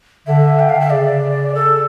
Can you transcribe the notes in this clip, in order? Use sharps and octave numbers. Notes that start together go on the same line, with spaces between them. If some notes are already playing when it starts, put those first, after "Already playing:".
D3 E5
G5
F5
E5
C#3 D5
A4